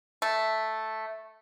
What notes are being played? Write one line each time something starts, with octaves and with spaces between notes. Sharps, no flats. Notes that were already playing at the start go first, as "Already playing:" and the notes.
A3